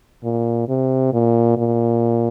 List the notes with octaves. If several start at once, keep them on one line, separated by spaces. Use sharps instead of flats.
A#2
C3
A#2
A#2